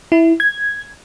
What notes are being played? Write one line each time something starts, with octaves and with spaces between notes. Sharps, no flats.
E4
G#6